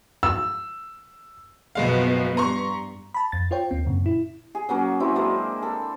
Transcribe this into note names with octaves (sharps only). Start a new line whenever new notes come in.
E6
F#1 B2 F3 G#3 B3 F5
G2 A#5 C6 C#6
A5 B5
F2 A6
F4 C5 C#5 G5
D#2 C4
F#2 A#2 C#3
E4
G#4
F#3 A#3 C#4
F#3 C4 E4
G#3 A#3 D4
A4